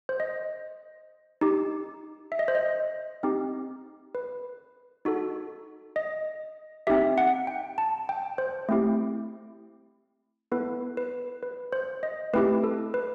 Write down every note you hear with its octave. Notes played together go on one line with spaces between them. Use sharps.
C5
D#5
D#4 G4
E5
D#5
C5
D#5
C4 D#4 G4
B4
D#4 F#4 A4
D#5
C4 D#4 G4 E5
F#5
G5
A5
G5
C5
A3 C4 E4 G4
B3 E4 A4 B4
B4
B4
C5
D#5
A3 C4 E4 G4 B4
A4
B4